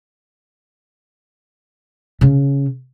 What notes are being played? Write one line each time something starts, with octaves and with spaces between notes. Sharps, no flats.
C#3 C#4